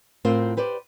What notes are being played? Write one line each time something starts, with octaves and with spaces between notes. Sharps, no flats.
A2 C4 F4 A#4 C5
G4 B4 C5 D5